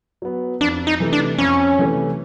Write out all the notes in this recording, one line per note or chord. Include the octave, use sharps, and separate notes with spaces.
F#3 B3
F2 D4
D#4
C3 E3 A3
D4
F2 C#4
C3 E3 A3